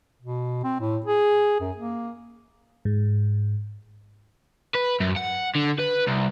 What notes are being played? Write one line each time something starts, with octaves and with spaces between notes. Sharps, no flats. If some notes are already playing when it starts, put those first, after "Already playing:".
B2
C4
A2
G#4
F#2
A#3
G#2
B4
F#2
F#5
D3
B4
C2